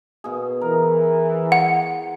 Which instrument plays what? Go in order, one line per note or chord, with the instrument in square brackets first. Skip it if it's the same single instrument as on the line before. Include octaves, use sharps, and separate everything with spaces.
[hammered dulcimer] B2 G#4
[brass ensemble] E3 [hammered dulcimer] A#4
[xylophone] F#5